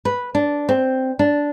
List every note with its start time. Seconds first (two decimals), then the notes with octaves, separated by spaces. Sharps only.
0.05 B4
0.35 D4
0.69 C4
1.19 D4